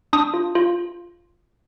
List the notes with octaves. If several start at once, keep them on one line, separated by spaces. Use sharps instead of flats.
D4 D#6
F4
F4